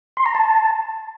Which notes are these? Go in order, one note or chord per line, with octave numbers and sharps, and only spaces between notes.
C6
A#5
A5